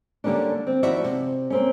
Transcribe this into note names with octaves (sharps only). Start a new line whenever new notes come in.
D3 G3 A#3 C#4 D4
C4
D#2 F3 E4 F#4 D5 E5
C3
A#3 C4 C#4